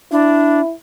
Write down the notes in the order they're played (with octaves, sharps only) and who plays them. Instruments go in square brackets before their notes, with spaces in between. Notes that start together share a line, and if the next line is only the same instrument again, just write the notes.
[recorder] D4 [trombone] E4